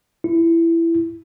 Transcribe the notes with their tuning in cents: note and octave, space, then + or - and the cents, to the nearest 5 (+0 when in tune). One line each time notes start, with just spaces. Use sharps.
E4 +15